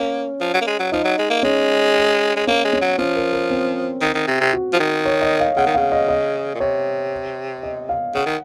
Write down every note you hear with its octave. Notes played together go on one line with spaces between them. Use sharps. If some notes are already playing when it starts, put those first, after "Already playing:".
Already playing: A#3 C#4
F3
F#3
A#3
G#3
F#3
F3 D#4
F#3
G#3
A#3
G#3 C#4
G#3
A#3 C#4
G#3
C#4
F#3
F3 C#4
A#4
A#4
C4
D#3
D#3
C3
C3
F#4
F3
D#3
C#5
D#5
F5
C#3 F#5
D#3
C#3 F5
D#5
D#5
A#2
C3 C#5
D#5
F5
C#3 F#5
D#3